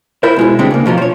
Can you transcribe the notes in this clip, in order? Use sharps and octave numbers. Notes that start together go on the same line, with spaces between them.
E4 F4 A#4 C5
B2 G#3 E4
D3 G3 G#3 B3 C4 D4
C#3 A#3
B2 F3 F#3 F4
C5 C#5